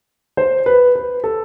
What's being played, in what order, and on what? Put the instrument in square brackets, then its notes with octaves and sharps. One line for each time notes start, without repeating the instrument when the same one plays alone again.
[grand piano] C5
B4
B4
A4